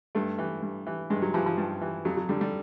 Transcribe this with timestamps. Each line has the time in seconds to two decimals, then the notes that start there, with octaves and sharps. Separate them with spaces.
0.15 G2 A3
0.38 E3
0.62 G2
0.87 E3
1.10 G2 G#3
1.22 F#3
1.34 E3 F3
1.46 F3
1.58 G2
1.81 E3
2.05 F2 F#3
2.17 F#3
2.29 D3 G3
2.41 G3